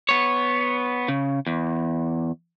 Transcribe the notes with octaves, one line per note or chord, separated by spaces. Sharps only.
B3 C#5
C#3
E2